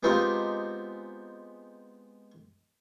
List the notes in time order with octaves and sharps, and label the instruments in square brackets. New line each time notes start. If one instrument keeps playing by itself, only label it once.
[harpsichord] G#3 B3 C4 D#4 F4 G4